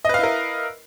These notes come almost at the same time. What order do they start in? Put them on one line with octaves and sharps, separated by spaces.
D#5 B4 F5 E4 A#4